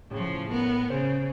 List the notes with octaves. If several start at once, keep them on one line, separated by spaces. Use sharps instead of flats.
A2 C#3 F3
B3 A#4
C#3 C5